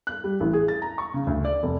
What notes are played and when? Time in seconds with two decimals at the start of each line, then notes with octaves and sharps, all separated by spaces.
0.07 F#6
0.24 G3
0.40 A1
0.53 G#4
0.68 A6
0.82 A#5
0.98 C#6
1.14 C#3
1.27 D2
1.45 D5
1.63 F1